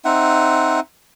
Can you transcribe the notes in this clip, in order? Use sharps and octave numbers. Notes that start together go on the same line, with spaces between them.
C4 D#4 E5 F#5